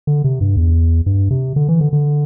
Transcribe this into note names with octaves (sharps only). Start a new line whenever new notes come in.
D3
C3
G2
E2
G2
C3
D3
E3
D3
D3